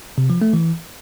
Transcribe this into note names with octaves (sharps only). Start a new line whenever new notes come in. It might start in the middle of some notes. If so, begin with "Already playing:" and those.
C3
F3
A3
E3